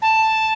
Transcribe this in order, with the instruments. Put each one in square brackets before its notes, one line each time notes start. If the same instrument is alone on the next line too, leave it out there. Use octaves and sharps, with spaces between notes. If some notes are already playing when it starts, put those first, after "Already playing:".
[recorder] A5